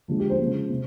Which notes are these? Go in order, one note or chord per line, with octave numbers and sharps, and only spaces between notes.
D3 F3 G#3
G4
C5
C#3 F3 G#3
C3